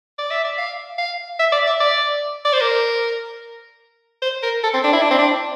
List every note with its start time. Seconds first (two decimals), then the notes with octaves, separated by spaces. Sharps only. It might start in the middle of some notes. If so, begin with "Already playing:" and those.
0.18 D5
0.31 E5
0.45 D5
0.58 F5
0.98 F5
1.39 E5
1.52 D5
1.67 E5
1.80 D5
2.45 D5
2.53 C5
2.61 A#4
4.22 C5
4.43 A#4
4.64 A4
4.74 C4
4.84 D4
4.93 E4
5.02 D4
5.11 C4
5.19 D4